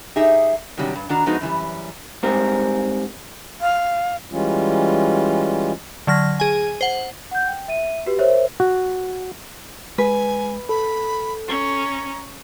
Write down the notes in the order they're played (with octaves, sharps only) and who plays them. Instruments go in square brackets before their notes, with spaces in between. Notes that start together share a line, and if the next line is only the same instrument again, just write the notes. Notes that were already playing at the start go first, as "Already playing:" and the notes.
[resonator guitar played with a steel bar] D#4 G4 G#4 E5
C3 D#3 F#3 G3 C#4
G2
D#3 D4 F#4 A#5
F3 G#3 B3 D#4 F#4
F#2 E3 G3
[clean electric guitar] G#2 G3 C4 A#4
[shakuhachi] F5
[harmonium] E3 G3 G#3 C#4 F4
[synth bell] D3 F#3 F6 A#6
G#4 G#5
C5 F#5
[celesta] F#5 G6
G5
E5 D#7
F#4 G4 B4
A#4 C5 C#5 E5
[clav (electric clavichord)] F#4
[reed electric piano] G#3 [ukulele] B4 [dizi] G#5
[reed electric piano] A4 [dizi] B5
[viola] C#4 [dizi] A#5